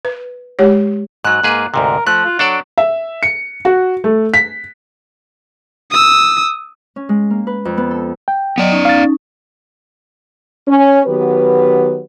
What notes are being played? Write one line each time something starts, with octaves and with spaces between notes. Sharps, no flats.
B4
G#3 G4 C#5
G#2 F#3 F#6
G#2 A#3 G#4 B4
D2 G#2 C3 A#4
F3 A3 F#6
F4
F#3 D4 A4 D5
E5
C#7
F#4
A3
B6
D#6 E6
C#4
G#3
A#3
B4
F2
B3
A4
G5
F#3 B3 D5 D#5
C#4 D#4
F5 A6
C#4
D#3 F#3 B3 G4 B4